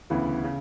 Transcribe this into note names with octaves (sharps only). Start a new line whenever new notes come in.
D2 C#3 E3 B3
C#3